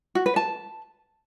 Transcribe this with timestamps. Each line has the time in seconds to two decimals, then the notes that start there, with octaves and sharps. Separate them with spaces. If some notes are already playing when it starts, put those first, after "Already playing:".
0.15 F#4
0.26 B4
0.36 A5